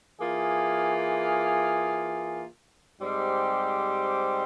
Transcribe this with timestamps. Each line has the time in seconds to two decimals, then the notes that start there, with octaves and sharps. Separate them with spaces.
0.20 E3 A#3 F4 G#4
3.01 G#2 G3 C4 G4 C5